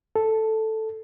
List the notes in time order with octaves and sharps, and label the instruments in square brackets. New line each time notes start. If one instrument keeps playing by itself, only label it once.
[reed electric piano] A4